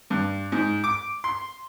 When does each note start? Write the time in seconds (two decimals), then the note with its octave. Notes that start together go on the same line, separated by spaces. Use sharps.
0.10 G2
0.52 G#2
0.84 D6
1.24 C6